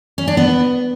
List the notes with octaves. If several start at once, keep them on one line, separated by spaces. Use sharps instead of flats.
C#4
D4
B3